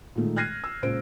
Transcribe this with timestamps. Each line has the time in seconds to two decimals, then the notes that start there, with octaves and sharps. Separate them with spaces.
0.15 A#2 D#3 G#3 A3
0.36 F6 F#6 G#6 A#6 C7 D#7
0.64 E6
0.82 C#2 A#2 C5 D7